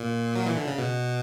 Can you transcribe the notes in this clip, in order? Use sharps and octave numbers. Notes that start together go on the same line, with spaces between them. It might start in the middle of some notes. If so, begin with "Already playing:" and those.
Already playing: A#2
F#3
E3
D3
C#3
B2